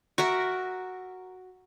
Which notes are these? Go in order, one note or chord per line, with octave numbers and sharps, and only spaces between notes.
F#4 A#4 E5